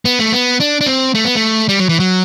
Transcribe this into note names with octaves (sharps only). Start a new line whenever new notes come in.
B3
A3
B3
D4
D4
C4
A3
B3
A3
G3
F#3
E3
F#3